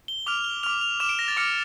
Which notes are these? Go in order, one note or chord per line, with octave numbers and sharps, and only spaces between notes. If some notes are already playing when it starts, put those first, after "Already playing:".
G7
D6 F6 F7
G7
D6 F6 F7
F7
D6 F6 E7
D7
A#6
A6
D6 F6 C#7